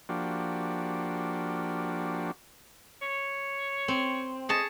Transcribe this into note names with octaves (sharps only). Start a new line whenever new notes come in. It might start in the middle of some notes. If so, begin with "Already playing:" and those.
F3 A#3 D4 F#4 G4
C#5
C4
G#4 C#5 D#5 A5